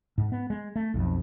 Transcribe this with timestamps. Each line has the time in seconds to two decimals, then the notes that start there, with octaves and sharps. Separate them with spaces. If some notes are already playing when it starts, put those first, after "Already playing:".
0.18 G#2
0.32 B3
0.50 G#3
0.76 A3
0.94 B1 F2